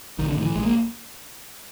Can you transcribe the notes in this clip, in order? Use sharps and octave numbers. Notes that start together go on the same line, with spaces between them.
A#1 D#3
D3
A2 D#3
E3
A#1 G#3
A#3